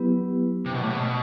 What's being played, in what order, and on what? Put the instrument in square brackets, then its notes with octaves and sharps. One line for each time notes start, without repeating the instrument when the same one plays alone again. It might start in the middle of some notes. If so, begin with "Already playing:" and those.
Already playing: [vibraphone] F#3 B3 E4 G4 B4
[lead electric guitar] C3
B2
A2
B2